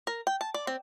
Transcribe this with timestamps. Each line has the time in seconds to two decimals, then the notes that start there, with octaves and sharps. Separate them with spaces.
0.07 A#4
0.27 G5
0.41 A5
0.54 D5
0.67 C4